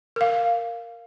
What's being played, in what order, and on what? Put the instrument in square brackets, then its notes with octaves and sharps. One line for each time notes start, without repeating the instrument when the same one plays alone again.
[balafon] A#4 F5